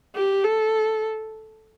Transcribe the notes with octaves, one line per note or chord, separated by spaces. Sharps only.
G4
A4